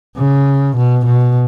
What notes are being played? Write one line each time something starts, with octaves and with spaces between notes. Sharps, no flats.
C#3
B2
B2